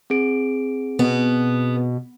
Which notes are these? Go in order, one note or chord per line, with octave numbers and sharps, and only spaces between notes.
C4 G#4 D7
B2 B3